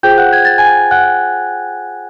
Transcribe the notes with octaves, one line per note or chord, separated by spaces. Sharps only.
F4 G#4 C5 G5 G6
F#5 F#6
G#6
A6
G#5 G#6
F#5 F#6